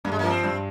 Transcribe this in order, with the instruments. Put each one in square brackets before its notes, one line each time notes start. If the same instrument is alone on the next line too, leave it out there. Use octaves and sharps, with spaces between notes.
[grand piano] G2 [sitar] A#3
[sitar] G#3
[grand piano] F3 [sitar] A#3
[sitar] C4
[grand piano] G2